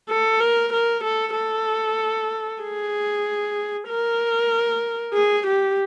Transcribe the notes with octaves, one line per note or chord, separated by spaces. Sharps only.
A4
A#4
A#4
A4
A4
G#4
A#4
G#4
G4